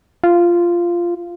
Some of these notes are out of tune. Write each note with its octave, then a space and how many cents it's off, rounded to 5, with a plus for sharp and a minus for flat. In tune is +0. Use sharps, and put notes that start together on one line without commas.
F4 -10